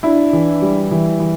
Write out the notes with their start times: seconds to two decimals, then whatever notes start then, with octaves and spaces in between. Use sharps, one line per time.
0.03 D4 E4
0.33 E3
0.62 G3
0.91 E3
1.20 E3